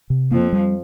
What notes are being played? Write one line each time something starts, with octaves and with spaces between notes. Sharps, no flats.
C3
F2 F3 A#3
G3